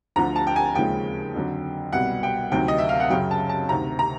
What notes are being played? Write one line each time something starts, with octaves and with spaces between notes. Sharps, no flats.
D2 D3 F3 A#5
A5
G5
G#5
D#2 C#3 F3 G#3 G5
F2 D3 F#3
C2 B2 G3 F#5
G5
D2 C3 D#3 F#3 G5
D#5
E5
F5
F#5
F#2 C#3 F#3 G5
A5
A5
D2 C3 D#3 A#5
A#5